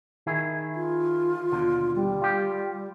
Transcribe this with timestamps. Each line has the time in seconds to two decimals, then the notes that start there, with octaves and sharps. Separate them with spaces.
0.27 D#3 E4 G#4
0.75 F4
1.52 D#2 B2 D3
1.96 G3
2.22 F4 G4